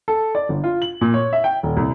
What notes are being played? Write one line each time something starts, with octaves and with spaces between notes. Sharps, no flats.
A4
D5
G1
F4
F#7
A#2
C#5
E5
G5
D#1
C2